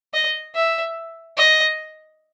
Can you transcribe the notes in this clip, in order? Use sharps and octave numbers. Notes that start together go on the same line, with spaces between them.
D#5
E5
D#5